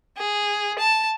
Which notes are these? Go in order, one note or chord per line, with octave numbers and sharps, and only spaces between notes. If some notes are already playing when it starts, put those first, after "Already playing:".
G#4
A5